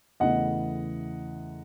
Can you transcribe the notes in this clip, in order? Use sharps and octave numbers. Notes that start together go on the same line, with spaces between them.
E2 C#3 E3 A3 D#5 F#5